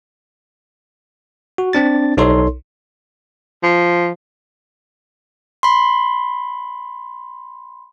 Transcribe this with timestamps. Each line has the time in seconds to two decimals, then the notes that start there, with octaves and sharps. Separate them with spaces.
1.58 F#4
1.73 C4 D4 A6
2.17 B1 D#4 A4 C#5 C6
3.63 F3
5.63 B5 C6